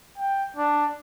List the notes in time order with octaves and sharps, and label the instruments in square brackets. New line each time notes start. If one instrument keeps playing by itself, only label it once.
[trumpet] G5
D4